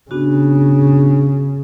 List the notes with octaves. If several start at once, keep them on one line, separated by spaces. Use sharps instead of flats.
C#3 B3 D4 F#4